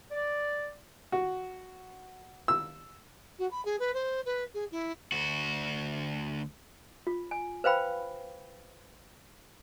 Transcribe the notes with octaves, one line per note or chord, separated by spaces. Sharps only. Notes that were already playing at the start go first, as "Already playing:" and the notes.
D5
F#4
E6
F#4
B5
G#4
B4
C5
B4
G#4
E4
D2 F#4
F4
G#5
B4 C5 F5 G5 B5